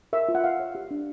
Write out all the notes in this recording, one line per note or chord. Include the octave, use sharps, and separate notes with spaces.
A#4 E5
F4
F#5
F4 F5
C#5
G4
D4